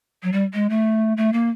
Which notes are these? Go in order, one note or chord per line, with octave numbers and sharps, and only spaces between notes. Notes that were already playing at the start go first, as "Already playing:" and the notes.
F#3
G3
G#3
A3
A3
A#3